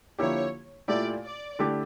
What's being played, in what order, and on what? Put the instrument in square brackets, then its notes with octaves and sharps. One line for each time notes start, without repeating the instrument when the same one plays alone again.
[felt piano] D3 F3 A#3 E4 G4 [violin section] C#5
[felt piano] A#2 A3 E4 G4 [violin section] D5
[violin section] D5
[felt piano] D3 A3 E4 G4